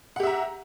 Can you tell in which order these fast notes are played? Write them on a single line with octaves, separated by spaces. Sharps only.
F#5 G4 E5 A#5